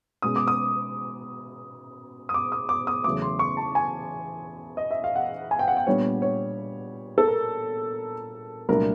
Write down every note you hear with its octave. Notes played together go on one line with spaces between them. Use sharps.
B2 G#3 C#4 D#6
D6
D#6
D#6
D6
D#6
D6
D#6
E2 C#3 F#3 A3 D6
C6
C#6
A5
G#5
D#5
E5
F5
F#5
G#5
G5
F#5
G5
A#2 G3 B3 D4 C#5
C#5
A4
A#4
C2 A#2 F#3 A3 D4 A#4